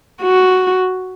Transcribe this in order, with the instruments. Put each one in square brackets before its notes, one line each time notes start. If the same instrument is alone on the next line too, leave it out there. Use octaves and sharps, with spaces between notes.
[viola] F#4